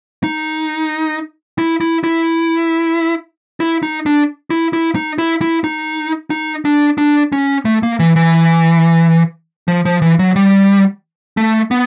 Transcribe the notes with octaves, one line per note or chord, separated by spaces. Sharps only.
D#4
E4
E4
E4
E4
D#4
D4
E4
E4
D#4
E4
E4
D#4
D#4
D4
D4
C#4
A3
A#3
E3
E3
F3
F3
E3
F#3
G3
A3
B3